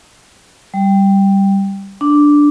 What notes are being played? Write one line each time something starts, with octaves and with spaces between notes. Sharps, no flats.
G3
D4